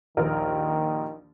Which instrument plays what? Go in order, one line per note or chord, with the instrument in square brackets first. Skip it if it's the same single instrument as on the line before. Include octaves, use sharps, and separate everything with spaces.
[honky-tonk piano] A#1 D#2 A#4 [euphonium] D#3